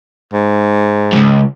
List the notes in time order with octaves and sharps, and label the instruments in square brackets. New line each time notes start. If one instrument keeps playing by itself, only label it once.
[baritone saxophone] G#2
[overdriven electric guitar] C#2 F#2